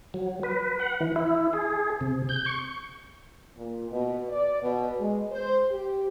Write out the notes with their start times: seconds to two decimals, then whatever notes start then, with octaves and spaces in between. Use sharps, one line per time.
0.14 F#3
0.43 B4
0.80 F#5
1.00 E3
1.16 E4
1.53 G#4
2.01 C3
2.29 G6
2.46 C#6
3.57 A#2
3.91 B2
4.29 D5
4.62 B2
4.99 G#3
5.32 C5
5.71 G4